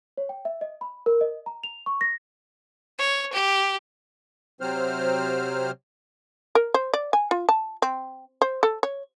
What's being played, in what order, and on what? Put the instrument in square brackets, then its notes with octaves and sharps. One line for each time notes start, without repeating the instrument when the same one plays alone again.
[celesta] C#5
G5
E5
D#5
B5
A#4
D#5
A#5
F7
C#6
A#6
[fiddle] C#5
G4
[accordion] C3 F#3 C4 C5 F6
[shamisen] A#4
C5
D5
G#5
F4
A5
C4
C5
A4
C#5